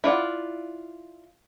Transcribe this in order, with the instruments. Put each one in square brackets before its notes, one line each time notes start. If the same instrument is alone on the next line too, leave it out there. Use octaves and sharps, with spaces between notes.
[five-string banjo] E4 F4 D5 F#5